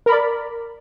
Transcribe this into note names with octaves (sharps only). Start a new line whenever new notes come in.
A#4 D5 B5